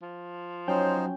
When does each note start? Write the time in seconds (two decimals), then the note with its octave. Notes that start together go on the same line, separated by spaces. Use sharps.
0.02 F3
0.68 F#3 C#4 D#4 C5 G5 G6